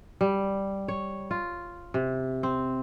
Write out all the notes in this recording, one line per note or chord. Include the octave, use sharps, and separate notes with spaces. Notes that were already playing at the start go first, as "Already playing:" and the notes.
G3
C#5
F4
C3
C4